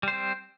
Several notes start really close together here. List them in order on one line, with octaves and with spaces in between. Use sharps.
G3 C5 C4